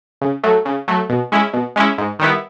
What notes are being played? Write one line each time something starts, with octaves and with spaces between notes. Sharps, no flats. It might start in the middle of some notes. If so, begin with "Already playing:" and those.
C#3
F#3 A3
C#3
F#3 A3
B2
G#3 C#4 E4
B2
G#3 C#4 E4
G#2
D#3 G3 B3 E4